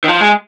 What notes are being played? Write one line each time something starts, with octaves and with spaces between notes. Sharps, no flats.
D#3
F3
G#3